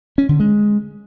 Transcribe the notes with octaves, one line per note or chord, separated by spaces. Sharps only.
C#4
D3
G#3